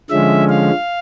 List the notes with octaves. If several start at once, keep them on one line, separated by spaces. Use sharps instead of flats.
D3 F3 G#3 C#4 E5
F5